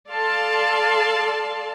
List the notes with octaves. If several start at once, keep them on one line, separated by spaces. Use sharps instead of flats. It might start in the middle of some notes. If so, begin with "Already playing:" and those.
A4 D5 F5 A5 C6